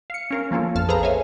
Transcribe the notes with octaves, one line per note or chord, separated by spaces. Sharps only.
F5 C#7
C#4 A#4 F5
F3 A#3 C#4 F4 A4
A#1 F2 A5 F6
G#4 A4 B4 C5 F5 A#5
C#5 E5 F5 G#5